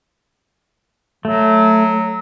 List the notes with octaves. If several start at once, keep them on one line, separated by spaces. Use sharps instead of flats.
F#3 A3